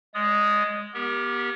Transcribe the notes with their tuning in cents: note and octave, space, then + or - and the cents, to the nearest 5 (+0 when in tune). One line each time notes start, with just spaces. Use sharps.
G#3 +0 D5 -40 D#6 +0
B3 -30 G4 +0 A#4 +15